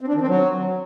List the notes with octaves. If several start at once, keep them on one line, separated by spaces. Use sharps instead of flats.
C4
D4
D#3
C4
F#3